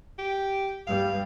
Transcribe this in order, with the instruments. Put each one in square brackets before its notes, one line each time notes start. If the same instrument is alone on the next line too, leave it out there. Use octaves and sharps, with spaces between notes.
[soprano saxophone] G4
[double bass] G2 G3 [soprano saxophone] F5